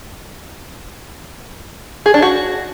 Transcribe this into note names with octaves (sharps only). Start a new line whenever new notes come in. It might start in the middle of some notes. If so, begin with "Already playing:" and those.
G#4
D4
F#4